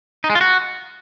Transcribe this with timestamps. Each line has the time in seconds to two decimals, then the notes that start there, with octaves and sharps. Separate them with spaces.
0.24 D#4
0.30 G#3
0.35 F4
0.41 F#4